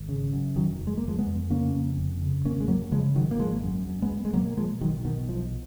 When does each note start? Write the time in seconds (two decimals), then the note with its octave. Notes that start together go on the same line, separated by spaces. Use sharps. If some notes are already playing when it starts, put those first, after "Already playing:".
Already playing: G#1
0.09 C#3
0.33 F#2
0.55 F1 D#3 F#3
0.79 F1
0.87 G#3
0.97 A#3
1.03 F1 F3 G#3
1.19 G#3 B3
1.26 F2
1.50 C#3 A#3 C#4
1.74 F2
1.97 F1
2.21 C#3
2.45 G#1 A#3 C#4
2.60 G#3
2.68 F#2 F#3 A#3
2.92 C#3 F3 G#3
3.15 G#1 D#3 F#3
3.31 A#3
3.39 G#1 F3 G#3
3.63 F#2
3.87 F#2
4.02 G#3 B3
4.10 F#2
4.25 G#3
4.34 B2 F#3 A#3
4.46 A#3
4.57 B2 F3 G#3
4.81 B1 D#3 F#3
5.05 B2 D#3
5.28 B1 F3